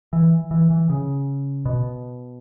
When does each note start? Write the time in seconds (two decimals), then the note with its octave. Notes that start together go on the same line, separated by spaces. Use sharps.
0.13 E3
0.51 E3
0.70 E3
0.90 C#3
1.66 B2